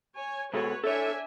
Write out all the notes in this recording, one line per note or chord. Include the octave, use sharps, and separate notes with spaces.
C#5 G#5
B2 G#3 F#4 A4 B4 C#5
D4 A4 C#5 E5 G#5